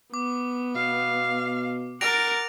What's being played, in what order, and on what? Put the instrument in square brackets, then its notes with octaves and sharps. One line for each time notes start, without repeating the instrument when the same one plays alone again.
[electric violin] B3 [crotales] D6
[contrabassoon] B2 [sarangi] F5
[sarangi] A#4 [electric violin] F#5 A6 [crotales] A#6 D7 F7